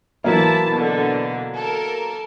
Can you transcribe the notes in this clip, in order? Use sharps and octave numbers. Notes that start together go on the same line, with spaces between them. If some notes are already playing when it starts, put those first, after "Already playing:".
E3 F#3 A#3 E4 A5
B2 D3
A4 A#4